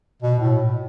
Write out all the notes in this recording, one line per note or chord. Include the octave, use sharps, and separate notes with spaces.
B2
A2